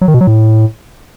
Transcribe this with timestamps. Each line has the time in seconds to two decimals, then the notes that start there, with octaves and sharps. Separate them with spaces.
0.01 F#3
0.08 D#3
0.14 B2
0.21 F#3
0.27 A2